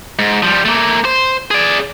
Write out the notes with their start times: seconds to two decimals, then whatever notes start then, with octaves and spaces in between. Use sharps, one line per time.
0.19 G#2
0.43 F3 G3
0.65 A3 A#3
1.05 C5
1.51 G#4 D5